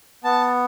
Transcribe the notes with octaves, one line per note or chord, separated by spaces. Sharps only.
B3 A5